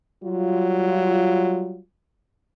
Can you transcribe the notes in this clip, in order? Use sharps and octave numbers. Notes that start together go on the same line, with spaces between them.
F#3 G3 F4